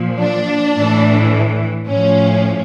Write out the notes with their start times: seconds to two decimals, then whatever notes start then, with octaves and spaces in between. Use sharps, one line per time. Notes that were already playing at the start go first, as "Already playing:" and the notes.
Already playing: A#2 F3
0.20 D4
0.76 A2 E3
1.87 A2 F3 C#4